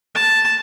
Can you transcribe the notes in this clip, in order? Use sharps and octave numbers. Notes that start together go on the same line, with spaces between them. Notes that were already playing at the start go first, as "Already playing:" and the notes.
A5